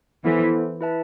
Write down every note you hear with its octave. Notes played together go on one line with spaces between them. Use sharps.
E3 B3 E4 A4 C5
E4 B4 E5 A5